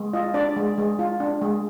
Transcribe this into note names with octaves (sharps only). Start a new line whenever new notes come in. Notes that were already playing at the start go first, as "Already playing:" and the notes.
Already playing: G#3
F4 D#5
D4 D5
G#3
G#3
F4
D4
G#3